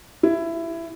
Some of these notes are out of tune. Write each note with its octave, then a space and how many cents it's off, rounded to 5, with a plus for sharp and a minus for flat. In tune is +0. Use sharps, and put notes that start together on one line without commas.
E4 +15